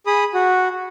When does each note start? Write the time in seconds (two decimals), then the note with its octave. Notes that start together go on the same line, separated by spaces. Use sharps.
0.07 G#4 B5 D#6
0.34 F#4